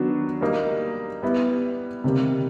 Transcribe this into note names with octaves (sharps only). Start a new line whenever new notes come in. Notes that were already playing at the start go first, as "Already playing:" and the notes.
Already playing: D#3 F#3 B3 D4 F#4
G3 A#3 D#4
G3 B3 E4
C3 D#3 G3 A#3